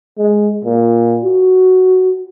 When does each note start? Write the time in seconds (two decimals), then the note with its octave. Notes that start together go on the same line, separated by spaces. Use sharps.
0.17 G#3
0.64 A#2
1.24 F#4